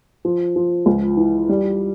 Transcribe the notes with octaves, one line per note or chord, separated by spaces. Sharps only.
F3
F3
C#2
E3
G3